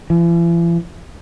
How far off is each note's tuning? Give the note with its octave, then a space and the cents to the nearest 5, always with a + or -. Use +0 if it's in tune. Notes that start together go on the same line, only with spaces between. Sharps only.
E3 +45